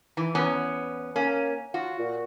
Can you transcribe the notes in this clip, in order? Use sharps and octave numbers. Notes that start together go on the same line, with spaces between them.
E3
E2 B3 C#4
A#3 C#4
F4 F#4
A#2